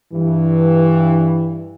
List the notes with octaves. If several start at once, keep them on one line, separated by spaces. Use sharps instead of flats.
G2 E3